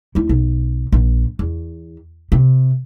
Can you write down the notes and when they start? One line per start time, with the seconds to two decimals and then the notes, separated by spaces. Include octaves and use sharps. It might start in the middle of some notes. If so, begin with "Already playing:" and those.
0.15 D2 E4
0.29 B1
0.92 A#1
1.39 E2
2.32 C3